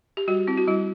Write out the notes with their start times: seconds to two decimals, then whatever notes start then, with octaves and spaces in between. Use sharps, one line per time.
0.17 G4
0.28 G3 F#4
0.47 C4 E4
0.58 F#4
0.67 G3 E4